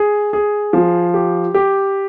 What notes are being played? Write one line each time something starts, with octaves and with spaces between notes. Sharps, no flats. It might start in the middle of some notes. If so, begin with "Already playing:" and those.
Already playing: G#4
G#4
F3
G4
G4